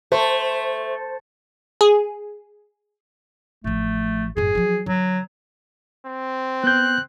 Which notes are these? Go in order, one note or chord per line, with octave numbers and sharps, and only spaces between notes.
A3 C5
G#4
A1 F3 A3
F#1 A2 G#4
F3 F#3
D3 F#3
C4
B3 F#6 G6